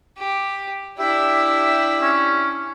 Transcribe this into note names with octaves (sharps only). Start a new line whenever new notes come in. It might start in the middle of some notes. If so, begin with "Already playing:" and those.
G4
D4 E4 G4 E5
C#4